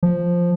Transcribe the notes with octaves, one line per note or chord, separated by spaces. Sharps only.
F3